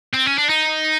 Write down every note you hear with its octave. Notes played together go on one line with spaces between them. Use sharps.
C4
C#4
D4
D#4